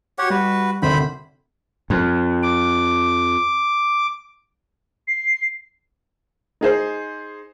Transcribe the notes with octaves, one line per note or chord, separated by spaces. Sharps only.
F#4 G4 C#5 F#5
G3 F#4 B4
G#1 D2 C3 C5 B5
F2
D6
C7
D#4 G#4 C5